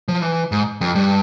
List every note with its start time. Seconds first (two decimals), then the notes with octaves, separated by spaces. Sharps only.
0.08 F3
0.22 E3
0.52 G#2
0.81 F2
0.95 G2